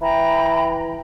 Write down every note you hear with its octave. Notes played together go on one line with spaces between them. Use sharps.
E3 G5 A#5 B5